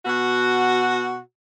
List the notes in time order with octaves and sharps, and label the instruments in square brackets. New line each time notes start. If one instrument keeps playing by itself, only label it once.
[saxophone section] B2 F#4